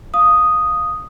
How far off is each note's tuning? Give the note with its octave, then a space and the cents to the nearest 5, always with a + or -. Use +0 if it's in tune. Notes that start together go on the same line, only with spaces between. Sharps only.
F5 +0 D#6 +0